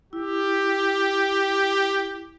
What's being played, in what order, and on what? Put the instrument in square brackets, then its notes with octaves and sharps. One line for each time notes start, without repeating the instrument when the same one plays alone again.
[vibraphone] E4 [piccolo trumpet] G4